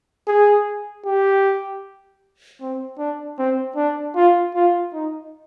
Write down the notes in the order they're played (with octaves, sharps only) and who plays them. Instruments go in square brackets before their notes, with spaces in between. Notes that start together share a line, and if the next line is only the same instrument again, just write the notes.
[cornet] G#4
G4
C4
D4
C4
D4
F4
F4
D#4